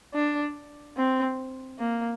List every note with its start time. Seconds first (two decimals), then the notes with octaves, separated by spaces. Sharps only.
0.14 D4
0.97 C4
1.79 A#3